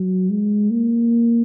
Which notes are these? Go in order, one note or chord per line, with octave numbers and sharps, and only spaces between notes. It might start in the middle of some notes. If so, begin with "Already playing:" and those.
Already playing: F#3
G#3
A#3